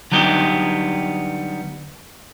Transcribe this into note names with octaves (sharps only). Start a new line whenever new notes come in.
D3 F#3 G3 B3 D#4 G4